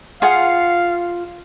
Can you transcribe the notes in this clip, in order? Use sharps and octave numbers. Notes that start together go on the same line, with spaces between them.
F4 G#4 F5 F#5